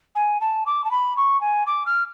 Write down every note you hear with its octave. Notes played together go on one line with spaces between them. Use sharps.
G#5
A5
D6
A5
B5
C#6
G#5
D6
F6